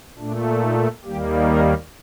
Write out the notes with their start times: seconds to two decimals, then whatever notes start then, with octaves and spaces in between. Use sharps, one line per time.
0.18 A#2 A3 D4
0.62 D#4
1.04 D#2 D#3 G3 A#3 G4
1.47 A#4